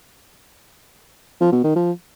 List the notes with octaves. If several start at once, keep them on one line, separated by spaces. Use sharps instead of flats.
F3
B2
D#3
F3